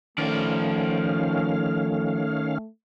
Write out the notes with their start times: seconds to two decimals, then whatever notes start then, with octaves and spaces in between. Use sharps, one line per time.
0.18 D#3 F3 A3 C#4 D5 F5